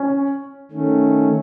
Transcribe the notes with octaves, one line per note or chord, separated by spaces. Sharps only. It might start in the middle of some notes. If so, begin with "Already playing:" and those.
Already playing: C#4
D#3 A3 C#4